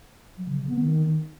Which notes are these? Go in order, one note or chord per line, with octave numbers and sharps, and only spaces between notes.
F#3
C#3
C#3
B3
D#3